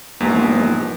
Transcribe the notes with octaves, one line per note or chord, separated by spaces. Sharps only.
A#1 E2 G2 A#2 F3 B3 D#4